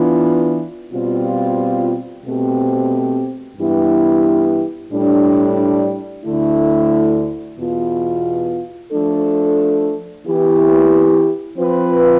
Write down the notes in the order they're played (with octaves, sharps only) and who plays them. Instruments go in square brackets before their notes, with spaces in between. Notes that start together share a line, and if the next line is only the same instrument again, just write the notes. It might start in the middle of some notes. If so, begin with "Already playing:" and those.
Already playing: [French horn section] E3 B3 D4 F4
B2 G3 C4 F4
B2 A3 C4 G4
G2 E3 B3 E4 G4
A2 G3 D4
D2 D3 A3 E4
E2 B2 B3 F4
F3 A3 D4 A4
E3 B3 E4 G4
F3 C4 F4 B4